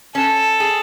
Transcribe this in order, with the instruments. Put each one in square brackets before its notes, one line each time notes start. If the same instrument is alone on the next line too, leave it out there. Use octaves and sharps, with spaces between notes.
[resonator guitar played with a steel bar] C#4 [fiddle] A4
[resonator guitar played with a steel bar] G#4